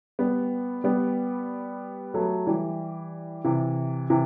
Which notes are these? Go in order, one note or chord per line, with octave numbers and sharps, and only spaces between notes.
G3 B3
G3 B3
F#3 A3
E3 G3
C3 E3
C3 E3